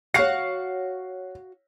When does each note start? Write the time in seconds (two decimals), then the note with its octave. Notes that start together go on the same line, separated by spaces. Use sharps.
0.14 F#4 C#5 F5 F#5 C7